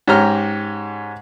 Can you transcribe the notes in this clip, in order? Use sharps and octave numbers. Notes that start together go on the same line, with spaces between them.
G#2 C#4 G4 A#5 F6